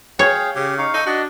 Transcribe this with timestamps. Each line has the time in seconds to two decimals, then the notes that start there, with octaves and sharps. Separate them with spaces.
0.19 G#4 C#5 F5 G5
0.56 C#3 G4
0.78 D#4 F5 C#6
0.94 D#4 A4
1.06 D4 F#4 D#5